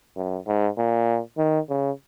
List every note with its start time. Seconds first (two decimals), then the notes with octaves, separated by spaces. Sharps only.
0.17 F#2
0.47 G#2
0.77 A#2
1.38 D#3
1.69 C#3